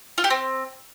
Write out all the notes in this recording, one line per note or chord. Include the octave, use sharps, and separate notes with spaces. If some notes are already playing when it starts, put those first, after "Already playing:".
F4
G4
C4